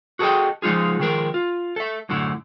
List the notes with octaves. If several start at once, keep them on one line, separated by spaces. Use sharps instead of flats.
F#4 G#4 A4 B4 D#5 G5
F3 G#3 D#4 F4 G#4
D#3 F3 G#3 G#4 A#4
F4
A4 E5
F#2 A2 D3 E4